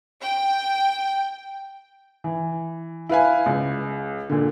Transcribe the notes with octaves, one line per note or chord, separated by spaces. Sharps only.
G5
E3
E4 B4 F5 G#5
C#2
A#2 D3